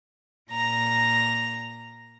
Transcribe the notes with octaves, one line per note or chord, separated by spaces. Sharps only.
A#2 A#5 A#6